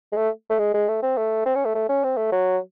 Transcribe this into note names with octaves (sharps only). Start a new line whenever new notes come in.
G#3
A3
A3
G#3
G#3
A3
C4
A3
C4
C#4
A3
A3
C#4
C4
A3
F#3